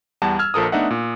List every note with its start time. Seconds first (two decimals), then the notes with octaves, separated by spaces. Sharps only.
0.22 E2 G3 F#5 A5
0.39 E6 F6 G#6
0.54 A#1 F3 A4 A#4 D#6
0.72 A3 B3 D4 D#4 E5 F#5
0.90 A#2